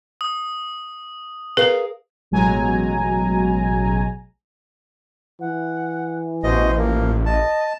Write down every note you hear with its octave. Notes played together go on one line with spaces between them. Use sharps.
D#6
G#4 A#4 B4 F5
A1 B2 F#3 G#3 G#5 A#5
E3 F#5
A1 B2 C5 D#5
F3 A#3
D#5 A5